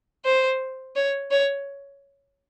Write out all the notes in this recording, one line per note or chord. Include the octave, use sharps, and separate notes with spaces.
C5
C#5
C#5